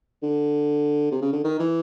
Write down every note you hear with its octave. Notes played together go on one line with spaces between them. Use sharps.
D3
C3
C#3
D3
D#3
E3